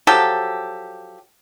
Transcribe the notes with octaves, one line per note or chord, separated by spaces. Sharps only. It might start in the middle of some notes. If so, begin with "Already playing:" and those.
F3 F#3 G4 A4